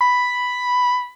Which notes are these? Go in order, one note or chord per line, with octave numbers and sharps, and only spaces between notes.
B5